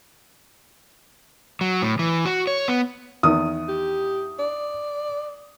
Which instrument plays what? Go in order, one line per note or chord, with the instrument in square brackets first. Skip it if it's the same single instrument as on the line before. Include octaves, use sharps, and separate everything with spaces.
[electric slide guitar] F#3
A2
E3
F#4
C#5
B3
[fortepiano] E2 D#3 [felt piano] D#6
[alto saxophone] G4
D5